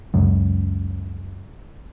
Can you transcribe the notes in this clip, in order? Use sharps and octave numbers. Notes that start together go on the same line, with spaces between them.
C#2 F#2